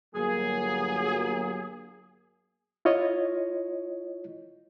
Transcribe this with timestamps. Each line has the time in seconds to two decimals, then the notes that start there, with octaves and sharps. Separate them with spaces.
0.15 G1 F#3 A#3 G#4
2.85 E4 F4 C#5 D#5